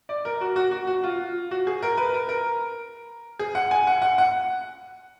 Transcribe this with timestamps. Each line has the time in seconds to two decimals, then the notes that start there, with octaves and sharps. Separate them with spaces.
0.09 D5
0.25 A#4
0.41 F#4
0.56 F#4
0.71 F#4
0.87 F#4
1.04 F4
1.51 F#4
1.67 G#4
1.83 A#4
1.97 B4
2.14 A#4
2.29 A#4
3.39 G#4
3.55 F#5
3.71 G#5
3.87 F#5
4.02 F#5
4.18 F#5